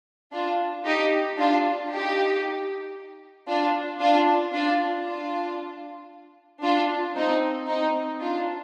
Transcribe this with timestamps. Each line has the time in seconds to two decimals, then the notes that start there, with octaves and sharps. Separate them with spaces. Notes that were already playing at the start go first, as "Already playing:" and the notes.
0.33 D4 F4
0.85 D#4 G4
1.38 D4 F4
1.90 D#4 G4
3.48 D4 F4
4.01 D4 F4
4.53 D4 F4
5.05 D4 F4
6.63 D4 F4
7.16 C4 D#4
7.68 C4 D#4
8.21 D4 F4